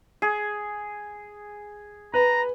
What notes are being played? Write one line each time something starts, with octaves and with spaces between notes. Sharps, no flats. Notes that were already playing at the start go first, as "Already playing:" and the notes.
G#4
B4 A#5